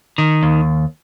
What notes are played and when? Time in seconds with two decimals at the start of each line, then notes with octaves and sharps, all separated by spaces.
0.18 D#3
0.43 D#2